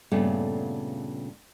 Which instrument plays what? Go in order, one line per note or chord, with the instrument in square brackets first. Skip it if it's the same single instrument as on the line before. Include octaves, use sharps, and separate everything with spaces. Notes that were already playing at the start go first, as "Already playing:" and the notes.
[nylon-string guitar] G2 A#2 C#3 A3 B3